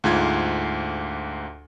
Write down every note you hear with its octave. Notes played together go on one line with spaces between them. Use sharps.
D2 G#2 F4 G#6